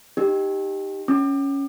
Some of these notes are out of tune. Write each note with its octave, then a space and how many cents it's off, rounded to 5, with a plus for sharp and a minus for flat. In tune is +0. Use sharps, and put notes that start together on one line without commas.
D#4 -10 G4 +0
C#4 +0 D6 +30